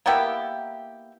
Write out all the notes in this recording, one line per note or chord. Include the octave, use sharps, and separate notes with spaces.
A#3 B3 E4 G4